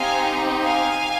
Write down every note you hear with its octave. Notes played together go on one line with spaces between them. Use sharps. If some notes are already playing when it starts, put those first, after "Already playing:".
Already playing: C4 D#4 G4 F5 G#5
F5 G#5